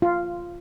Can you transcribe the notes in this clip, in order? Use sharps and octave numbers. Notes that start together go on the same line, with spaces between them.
F4